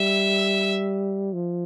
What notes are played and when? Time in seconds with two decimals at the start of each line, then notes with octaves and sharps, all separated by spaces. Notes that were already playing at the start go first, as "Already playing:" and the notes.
Already playing: G3 E5
1.33 F3